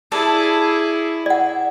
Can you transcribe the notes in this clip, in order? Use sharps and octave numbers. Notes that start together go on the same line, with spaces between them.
E4 G#4 A4 D5
D5 F#5